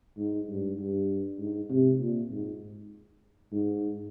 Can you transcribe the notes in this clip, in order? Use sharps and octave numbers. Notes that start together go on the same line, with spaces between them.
G#2
G2
G2
G#2
C3
A#2
G#2
G#2